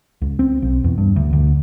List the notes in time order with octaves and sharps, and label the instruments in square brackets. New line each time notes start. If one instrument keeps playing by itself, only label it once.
[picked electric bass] C#2
C4
B1
E2
G2
D2
D2